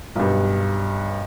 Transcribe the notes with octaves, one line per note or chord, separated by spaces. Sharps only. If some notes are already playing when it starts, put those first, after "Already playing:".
B1 G2